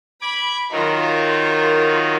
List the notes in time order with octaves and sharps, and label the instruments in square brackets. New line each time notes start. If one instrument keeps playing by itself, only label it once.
[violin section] B5 [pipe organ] D6 G#6
[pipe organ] D#3 F#3 D#4 [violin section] F4 A#4